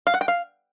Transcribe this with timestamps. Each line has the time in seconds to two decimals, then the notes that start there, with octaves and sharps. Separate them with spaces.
0.07 F5
0.14 F#5
0.21 G5
0.28 F5